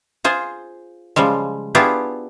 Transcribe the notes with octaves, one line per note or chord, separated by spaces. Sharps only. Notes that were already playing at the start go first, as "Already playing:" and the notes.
F4 G#4 C5
C#3 F3 G3 G#3
B3 D4 E4 F4 G4 G#4